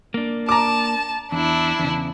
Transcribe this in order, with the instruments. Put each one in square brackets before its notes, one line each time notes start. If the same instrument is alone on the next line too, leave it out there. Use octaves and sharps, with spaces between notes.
[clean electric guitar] A#3 D4
[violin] A5 [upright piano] A#5 D6
[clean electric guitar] E2 [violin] D4 E4
[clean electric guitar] E2 C#3